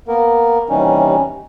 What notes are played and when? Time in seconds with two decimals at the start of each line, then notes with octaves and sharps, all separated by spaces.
0.08 A#3 B3 A#4
0.70 D#2 C3 E3 G3 C#4 D#4